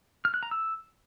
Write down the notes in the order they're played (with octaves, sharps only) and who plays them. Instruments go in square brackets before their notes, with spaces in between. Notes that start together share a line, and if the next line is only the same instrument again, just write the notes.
[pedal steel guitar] F6
F#6
A#5
E6